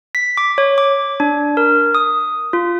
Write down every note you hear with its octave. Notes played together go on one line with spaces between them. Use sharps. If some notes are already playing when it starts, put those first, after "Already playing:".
B6
D6
C#5
D6
D4
A#4
D#6
F4